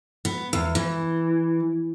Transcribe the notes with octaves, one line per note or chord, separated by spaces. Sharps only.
B3
E2
E3